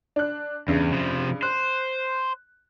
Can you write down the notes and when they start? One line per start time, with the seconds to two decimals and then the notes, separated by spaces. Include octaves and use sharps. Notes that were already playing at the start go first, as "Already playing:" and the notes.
0.16 D4 F#6
0.68 E2 G2 C#3
0.92 C3 F3
1.43 C5 F#6